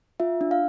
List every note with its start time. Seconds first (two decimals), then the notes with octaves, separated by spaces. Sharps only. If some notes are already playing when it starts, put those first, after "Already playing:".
0.20 F4 E5
0.41 D4
0.51 F5